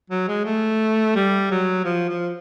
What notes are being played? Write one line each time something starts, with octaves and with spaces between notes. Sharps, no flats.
F#3
G#3
A3
G3
F#3
F3
F3